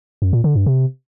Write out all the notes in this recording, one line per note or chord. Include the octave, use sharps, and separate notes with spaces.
F#2
A#2
D3
G2
C3